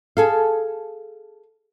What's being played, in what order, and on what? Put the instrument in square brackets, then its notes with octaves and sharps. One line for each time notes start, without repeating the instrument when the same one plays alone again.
[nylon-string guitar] G#4 A4 F5